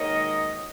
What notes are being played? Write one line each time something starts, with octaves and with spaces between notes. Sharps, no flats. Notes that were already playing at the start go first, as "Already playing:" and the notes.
Already playing: G#2 D#3 F#3 A#3 C#5 D#5